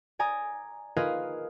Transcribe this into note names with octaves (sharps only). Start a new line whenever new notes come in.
D5 G#5 A#5 D#6
F4 G#4 A#4 B4 D#5 F5